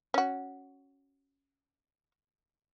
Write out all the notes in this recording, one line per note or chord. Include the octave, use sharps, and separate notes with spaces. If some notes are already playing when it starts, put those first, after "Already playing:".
C#4 F#4